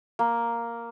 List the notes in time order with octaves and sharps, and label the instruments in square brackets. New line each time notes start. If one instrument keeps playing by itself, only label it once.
[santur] A#3